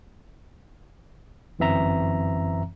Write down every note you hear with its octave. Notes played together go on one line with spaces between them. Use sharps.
G1 F#2 E3 C4 E5 A#5